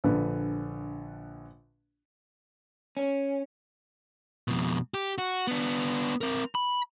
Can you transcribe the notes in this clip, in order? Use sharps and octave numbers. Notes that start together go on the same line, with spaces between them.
A#1 D3 B4
C#4
F2 B2
G4
F#4
B3 D4
C4 A#4
B5